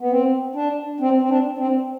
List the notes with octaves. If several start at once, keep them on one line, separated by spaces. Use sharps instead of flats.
B3
C4
D4
C4
C4
D4
C4